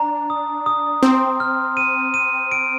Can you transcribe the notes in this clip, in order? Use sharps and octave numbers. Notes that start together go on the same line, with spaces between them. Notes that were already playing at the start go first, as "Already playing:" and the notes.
Already playing: D4 A#5
D#6
D#6
C4 C6
F6
D#7
D#7
D7